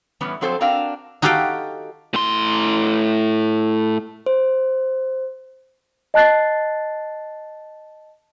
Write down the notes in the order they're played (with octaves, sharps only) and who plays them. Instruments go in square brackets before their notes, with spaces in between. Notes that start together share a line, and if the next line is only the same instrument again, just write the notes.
[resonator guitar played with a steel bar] A2 E3 G3 B3 C#4
F3 F#3 C4 A4 C5
C4 D4 F#4 A#4 F5 G5
[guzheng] D#4 F#4 G4 A4 F5 G5
[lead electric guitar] A2 C6
[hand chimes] C5
[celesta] D#5 A5 F#6 A6 C7